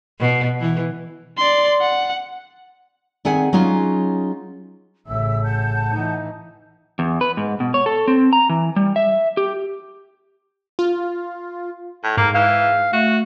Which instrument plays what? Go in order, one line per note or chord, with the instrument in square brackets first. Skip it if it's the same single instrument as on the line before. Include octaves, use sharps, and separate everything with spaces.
[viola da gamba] B2
E3
[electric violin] D5 C6
F#5
[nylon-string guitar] D#3 C4 G#4 E5 F#5 G#5
F#3 C#4 D#4 F4 G#4 F5
[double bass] A1 C#3 [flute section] E5 E6
[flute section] F#5 A5 G6
[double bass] E3 D#4
[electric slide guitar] E2
B4
G#2
B2
C#5
A4
C4
A#5
E3
G3
E5
G4
[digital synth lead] F4
[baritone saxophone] A2
[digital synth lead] G#2 [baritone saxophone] A#3
[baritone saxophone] E3 [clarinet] F5
[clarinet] A3 [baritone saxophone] F#4